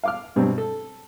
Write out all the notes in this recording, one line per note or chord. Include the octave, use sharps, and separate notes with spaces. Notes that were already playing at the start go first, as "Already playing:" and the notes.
F5 D6 F6
G2 B2 F#3 G3 C4
A4